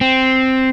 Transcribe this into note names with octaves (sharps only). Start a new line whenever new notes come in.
C4